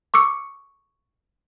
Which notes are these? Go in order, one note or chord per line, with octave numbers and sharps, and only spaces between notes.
C#6 D6 E6 C#7